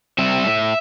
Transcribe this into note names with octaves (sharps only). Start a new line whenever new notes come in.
G3 C4 E5
A2